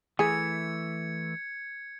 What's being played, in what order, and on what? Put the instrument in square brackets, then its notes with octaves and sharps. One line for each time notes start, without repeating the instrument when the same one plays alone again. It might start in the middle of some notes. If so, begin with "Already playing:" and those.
[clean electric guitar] E3 A3 [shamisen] G#4 [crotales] G#6 C#7